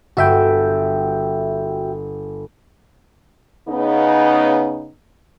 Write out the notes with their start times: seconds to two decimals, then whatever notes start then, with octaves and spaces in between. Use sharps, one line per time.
0.17 G1 F#4 E5 G5
3.68 C#3 B3 D#4